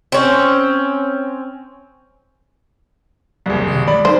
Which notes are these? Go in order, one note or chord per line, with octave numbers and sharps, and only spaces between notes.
C4 C#4
F#1 C2
C3 D#3
G#3 D5 B5
F#3 D#4 C5